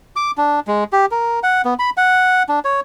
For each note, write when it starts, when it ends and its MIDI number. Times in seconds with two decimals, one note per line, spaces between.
0.16 0.31 86
0.37 0.60 62
0.67 0.84 56
0.93 1.06 67
1.11 1.40 70
1.43 1.62 78
1.65 1.74 59
1.79 1.90 83
1.97 2.43 78
2.49 2.59 62
2.64 2.80 73